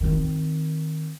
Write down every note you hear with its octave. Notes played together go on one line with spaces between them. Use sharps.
D#3 C4